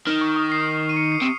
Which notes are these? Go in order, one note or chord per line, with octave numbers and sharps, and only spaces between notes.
D#3 F6
C#6
D#6
C7
D#7
C#7
C7
C3